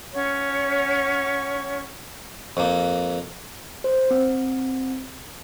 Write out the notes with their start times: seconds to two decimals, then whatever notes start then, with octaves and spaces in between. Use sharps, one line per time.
0.14 C#4 C#5 F#5 C#6
2.57 F2 A#3
3.84 C5
4.11 C4